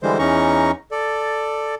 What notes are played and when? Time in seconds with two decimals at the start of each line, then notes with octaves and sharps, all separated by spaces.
0.03 D3 E3 G3 G#3 C5
0.19 E2 E3 C#4 D#4 A#5 C#6
0.91 A4 D5